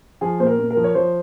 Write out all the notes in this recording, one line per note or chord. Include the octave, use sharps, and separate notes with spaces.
F3 G#4
A#2 C5
A#4
A#2
A#4
F3
C#5
F3 C5